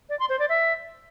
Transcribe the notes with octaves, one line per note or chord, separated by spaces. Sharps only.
D5
C6
C5
D5
E5